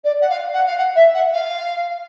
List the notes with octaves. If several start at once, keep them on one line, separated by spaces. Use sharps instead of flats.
D5
F#5
F5
F#5
F5
F#5
E5
F#5
F5